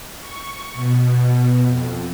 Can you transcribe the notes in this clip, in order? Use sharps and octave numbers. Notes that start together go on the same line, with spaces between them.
C#6
B2
F2